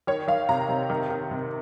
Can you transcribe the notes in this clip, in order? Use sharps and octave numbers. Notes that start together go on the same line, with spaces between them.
D#3 C#5
D#3 F5
C3 A#5
C3
D#3
D#3
C3